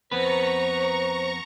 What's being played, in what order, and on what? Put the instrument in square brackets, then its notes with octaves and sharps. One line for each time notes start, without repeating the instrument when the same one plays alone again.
[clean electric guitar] F2 B3 B4 [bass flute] C5 [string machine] A#5 C#6